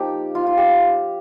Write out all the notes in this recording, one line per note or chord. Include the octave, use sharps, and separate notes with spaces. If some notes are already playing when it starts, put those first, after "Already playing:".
Already playing: F3 A#3 D#4 G4
F4
F4
G4